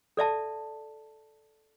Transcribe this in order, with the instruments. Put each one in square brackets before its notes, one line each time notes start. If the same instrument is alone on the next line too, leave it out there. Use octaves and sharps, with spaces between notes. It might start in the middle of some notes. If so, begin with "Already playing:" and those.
[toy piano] A4 D5 E5 A5